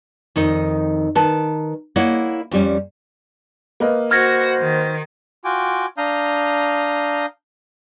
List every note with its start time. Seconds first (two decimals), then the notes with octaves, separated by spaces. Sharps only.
0.36 F2 D#3 D#4 D#5
1.15 D#3 B4 A5
1.96 A#3 E4 C#5 D#5 F#5
2.51 F2 G3 C#4
3.80 A#3 B4 D#5
4.11 F#4 C5 F6 G#6 A#6
4.58 D#3
5.44 F4 F#4 G5 G#5 D6
5.98 D4 F5 A#5 D#6 G6